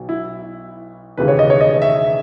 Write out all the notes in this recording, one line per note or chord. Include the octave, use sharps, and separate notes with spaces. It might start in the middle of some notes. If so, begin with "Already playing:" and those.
Already playing: B1 B2
E4
E1 D#2 C#3 E3 B4
C#5
D#5
C#5
D#5
E5